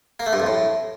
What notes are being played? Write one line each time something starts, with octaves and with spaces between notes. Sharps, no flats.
A#3
A3
G2
F2
A2